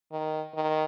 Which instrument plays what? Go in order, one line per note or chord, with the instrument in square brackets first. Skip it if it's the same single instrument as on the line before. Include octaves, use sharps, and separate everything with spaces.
[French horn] D#3
D#3